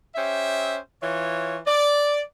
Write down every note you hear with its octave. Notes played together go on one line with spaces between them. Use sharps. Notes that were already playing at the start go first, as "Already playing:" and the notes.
C#4 G4 C5 E5
E3 F4 C#5
D5